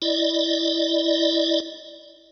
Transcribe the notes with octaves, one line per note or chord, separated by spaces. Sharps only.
E4 D5 D#5